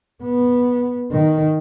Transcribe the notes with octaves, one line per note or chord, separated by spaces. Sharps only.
B3
D#3